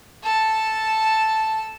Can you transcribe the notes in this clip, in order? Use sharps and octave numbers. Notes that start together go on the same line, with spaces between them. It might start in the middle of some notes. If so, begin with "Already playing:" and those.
A4 A5